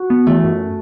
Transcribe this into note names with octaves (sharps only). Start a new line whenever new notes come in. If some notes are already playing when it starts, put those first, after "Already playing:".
Already playing: F#4
B3
E3 A3
F#2